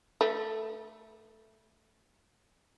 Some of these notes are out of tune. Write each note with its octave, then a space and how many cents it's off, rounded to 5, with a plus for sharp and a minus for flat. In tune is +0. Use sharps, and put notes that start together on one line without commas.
A3 +0 B4 -35